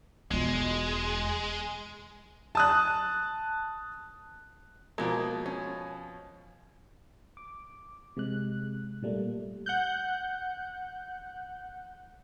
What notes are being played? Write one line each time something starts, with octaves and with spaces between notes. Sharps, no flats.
E1 G#3 F4
A5 D#6 F#6
B2 F3 G#3 A#3
C#4
D6
C3 G#3 F#6
A#2 G3 A3 A#3
F#5 F#6 G6